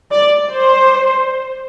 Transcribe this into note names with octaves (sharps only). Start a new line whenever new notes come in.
D5
C5